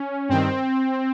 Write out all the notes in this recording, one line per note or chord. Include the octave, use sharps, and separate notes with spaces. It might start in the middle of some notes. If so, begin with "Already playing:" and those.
Already playing: C#4
G2 D#3 C4